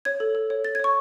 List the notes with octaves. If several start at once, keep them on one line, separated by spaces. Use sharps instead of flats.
C#5 G#6
A4
A4
C#5
C#5 A6
G#6
C#5 C#6